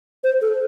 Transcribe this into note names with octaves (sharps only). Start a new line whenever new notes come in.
C5
A4